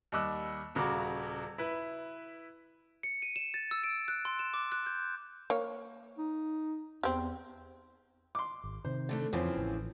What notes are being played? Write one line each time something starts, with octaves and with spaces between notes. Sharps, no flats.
D#2 G3 D#5 D6 E6 F#6
D#1 C#3 F#4 A#5 D6
E4 B4
C#7
D#7
E7
A6
E6
D7
F#6
C6
E7
D6
F#6
G6
A#3 C#5
D#4
E2 C4 G4
C6 D6
G#1
C3 D#3 C5
D3 A3 D4
F2 C#3 E3 F3 C4
A1